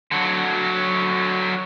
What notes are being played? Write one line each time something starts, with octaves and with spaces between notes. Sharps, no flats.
D3 F#3